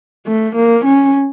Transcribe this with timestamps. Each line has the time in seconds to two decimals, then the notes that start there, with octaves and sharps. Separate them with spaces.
0.27 A3
0.56 A#3
0.85 C#4